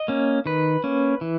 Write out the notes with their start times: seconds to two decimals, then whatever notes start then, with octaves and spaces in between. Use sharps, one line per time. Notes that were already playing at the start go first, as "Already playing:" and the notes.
Already playing: D#5
0.08 A#3 C#4
0.46 D#3 B4
0.84 A#3 C#4
1.21 E3